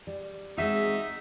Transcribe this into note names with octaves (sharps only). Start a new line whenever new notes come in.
G3
G#3 C4 D#4 F#4 E5